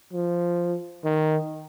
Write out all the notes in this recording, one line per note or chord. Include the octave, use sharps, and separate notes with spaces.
F3
D#3